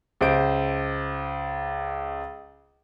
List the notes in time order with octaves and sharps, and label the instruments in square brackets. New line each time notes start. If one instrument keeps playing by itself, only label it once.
[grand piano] C#2 C5 D7